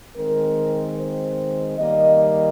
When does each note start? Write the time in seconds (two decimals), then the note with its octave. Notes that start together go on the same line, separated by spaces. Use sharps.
0.16 D#3 G#3 C4 A#4
0.98 C5
1.78 D#3 G3 A#3 D#5
2.19 D#5